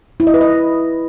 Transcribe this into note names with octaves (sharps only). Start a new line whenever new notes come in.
E4
D#5
B4
D#5